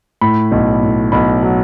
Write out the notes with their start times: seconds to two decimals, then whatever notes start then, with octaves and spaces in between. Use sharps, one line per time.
0.21 A2 B5
0.52 B1
0.83 A2
1.12 B1 B5
1.43 F#3